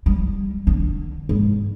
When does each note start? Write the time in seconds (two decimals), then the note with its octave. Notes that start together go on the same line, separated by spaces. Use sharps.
0.06 G3
0.67 D3
1.29 G#2